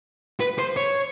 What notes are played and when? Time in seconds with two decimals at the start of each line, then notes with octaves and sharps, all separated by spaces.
0.40 B4
0.58 C5
0.77 C#5